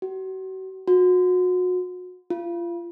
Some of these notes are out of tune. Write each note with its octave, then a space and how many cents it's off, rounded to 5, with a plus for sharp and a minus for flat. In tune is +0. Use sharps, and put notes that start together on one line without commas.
F#4 +40
F#4 -30
F4 -30